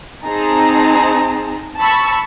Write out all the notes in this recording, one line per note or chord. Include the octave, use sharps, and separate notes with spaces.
C4 D#4 G#4 A5 A#5
A5 B5 C#6 E6